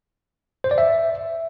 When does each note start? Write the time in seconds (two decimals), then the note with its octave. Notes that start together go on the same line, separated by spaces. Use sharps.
0.64 C5
0.71 D5
0.78 E5